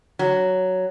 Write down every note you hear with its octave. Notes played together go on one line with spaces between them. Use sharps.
F#3